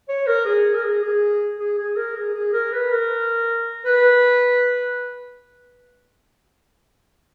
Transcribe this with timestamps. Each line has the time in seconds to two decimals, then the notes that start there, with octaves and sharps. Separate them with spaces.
0.09 C#5
0.27 A#4
0.46 G#4
0.75 A#4
0.84 G#4
1.03 G#4
1.60 G#4
1.79 G#4
1.97 A#4
2.16 G#4
2.34 G#4
2.53 A#4
2.72 B4
2.92 A#4
3.85 B4